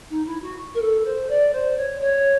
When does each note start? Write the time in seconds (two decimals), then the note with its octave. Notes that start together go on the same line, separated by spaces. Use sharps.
0.10 D#4
0.26 E4
0.42 F#4
0.74 A#4
0.81 A4
1.05 C5
1.29 D5
1.53 C5
1.77 C#5
2.00 C#5